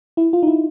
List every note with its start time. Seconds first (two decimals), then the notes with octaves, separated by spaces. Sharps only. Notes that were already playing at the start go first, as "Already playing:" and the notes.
0.17 E4
0.33 F4
0.43 D#4
0.47 E4